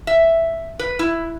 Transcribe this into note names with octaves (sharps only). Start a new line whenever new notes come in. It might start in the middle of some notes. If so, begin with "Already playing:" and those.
E5
B4
E4